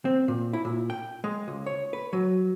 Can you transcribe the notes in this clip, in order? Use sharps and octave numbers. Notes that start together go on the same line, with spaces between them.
C4
A#2
E4
A#2
G5
G#3
C#2
C#5
B4
F#3